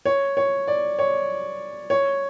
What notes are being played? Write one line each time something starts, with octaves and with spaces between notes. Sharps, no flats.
C#5
C#5
D5
C#5
C#5